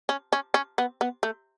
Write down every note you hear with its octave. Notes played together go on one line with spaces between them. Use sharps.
C#4
C#4
C#4
B3
B3
A3